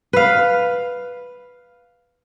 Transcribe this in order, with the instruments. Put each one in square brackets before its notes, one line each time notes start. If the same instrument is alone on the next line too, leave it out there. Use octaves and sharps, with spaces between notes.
[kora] B4 F5